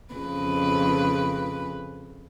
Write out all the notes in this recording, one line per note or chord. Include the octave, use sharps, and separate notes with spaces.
F2 C#3 B4